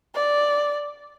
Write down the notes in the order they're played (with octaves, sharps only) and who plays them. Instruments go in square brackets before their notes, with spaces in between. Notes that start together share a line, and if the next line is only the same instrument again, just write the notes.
[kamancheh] D5